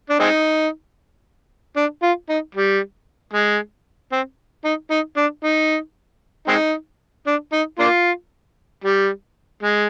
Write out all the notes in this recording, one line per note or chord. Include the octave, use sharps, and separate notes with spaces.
D4
G#3 C4 D#4
D4
F4
D#4
G3
G#3
C4
D#4
D#4
D4
D#4
G#3 C4 D#4
D4
D#4
A#3 D4 F4
G3
G#3